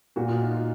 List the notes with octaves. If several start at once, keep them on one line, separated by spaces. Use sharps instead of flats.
A#2 F#4
F4
D#4
F4